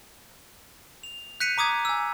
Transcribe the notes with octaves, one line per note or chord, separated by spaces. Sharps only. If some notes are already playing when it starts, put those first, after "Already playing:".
F7
F#6 G6 B6 C#7 D#7 F7
A#5 D6 D#6 G#6
G#5 E6